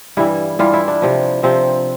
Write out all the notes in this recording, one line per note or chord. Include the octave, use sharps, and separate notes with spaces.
G2 E3 G3 E4
G2 E3 G3 F4
E4
D4
C3 F3
C3 F3 C4